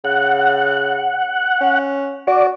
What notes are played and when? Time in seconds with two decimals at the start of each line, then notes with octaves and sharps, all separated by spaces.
0.05 C#3 F#5
1.61 C#4
2.27 F#4 D5